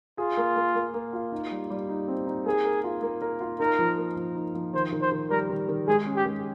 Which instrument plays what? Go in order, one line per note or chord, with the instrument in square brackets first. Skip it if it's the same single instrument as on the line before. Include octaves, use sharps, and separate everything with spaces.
[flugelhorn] F4 [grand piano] G#4
[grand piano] A#3
A#3
A#3
A#3
F4
D#4
G3
G3
D#4
C4
D#4
[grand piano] A#3 [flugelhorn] G#4
[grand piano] A#4
F4
A#3
A#4
F4
[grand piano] D#4 [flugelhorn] A#4
[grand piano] F3
A#3
F3
D#4
F3
[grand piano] D#3 [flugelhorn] C5
[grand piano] D#3
[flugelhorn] C5
[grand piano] D#3
[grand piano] G3 [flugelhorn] A#4
[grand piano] D#3
D#3
[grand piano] G#3 [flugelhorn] G#4
[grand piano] C#4
[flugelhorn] G4
[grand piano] G#3